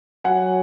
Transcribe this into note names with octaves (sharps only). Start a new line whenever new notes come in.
F#3 F#5 G#5